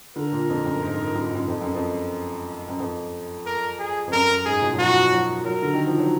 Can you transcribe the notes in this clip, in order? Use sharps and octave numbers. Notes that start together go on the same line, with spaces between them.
D3 A#4
A#2
F2
F#2
G#2
F#2
G#2
F#2
F2
F#2
F2
F#2
F2
A#4
G#4
F2
F#2 A#4
F#2
G#2 G#4
B2
F#3
F3 F#4
F#3
F#3 A#4
D3
D#3
F3
F#3